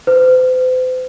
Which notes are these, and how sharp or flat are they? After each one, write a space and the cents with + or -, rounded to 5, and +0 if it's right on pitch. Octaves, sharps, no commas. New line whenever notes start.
C5 -40